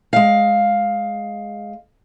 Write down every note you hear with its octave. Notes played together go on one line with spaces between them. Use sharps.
G#3 F5